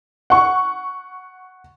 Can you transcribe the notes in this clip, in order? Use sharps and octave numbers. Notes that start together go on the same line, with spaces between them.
F#5 C#6